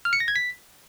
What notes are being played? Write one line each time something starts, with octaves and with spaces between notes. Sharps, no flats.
F6
C#7
A#6
G#6
B6